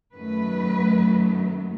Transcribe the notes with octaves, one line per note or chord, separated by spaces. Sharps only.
F#2 D#3 F#3 A3 B4